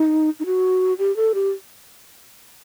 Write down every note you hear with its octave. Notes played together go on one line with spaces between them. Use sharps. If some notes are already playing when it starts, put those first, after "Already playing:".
Already playing: D#4
D#4
F#4
G4
A4
G4